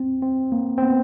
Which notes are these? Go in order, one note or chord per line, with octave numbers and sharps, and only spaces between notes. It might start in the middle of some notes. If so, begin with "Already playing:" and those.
Already playing: C4
C4
A#3
C4
B3